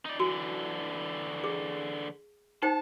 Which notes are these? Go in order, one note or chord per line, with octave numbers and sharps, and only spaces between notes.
D#4 D5
D3 E3 F#4
G#4
D#4 C5 G5 A5